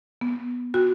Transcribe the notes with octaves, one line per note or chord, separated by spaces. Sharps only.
B3
F#4